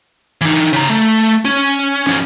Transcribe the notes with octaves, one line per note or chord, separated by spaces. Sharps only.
E3 D#4
C#3 A#5
A3
C#4
F3 C#4